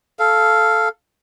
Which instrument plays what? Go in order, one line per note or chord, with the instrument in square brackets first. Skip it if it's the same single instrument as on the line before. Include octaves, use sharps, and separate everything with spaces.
[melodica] A4 F5